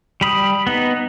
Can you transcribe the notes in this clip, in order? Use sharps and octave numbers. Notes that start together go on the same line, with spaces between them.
G3 B5 D#6
B3 D#4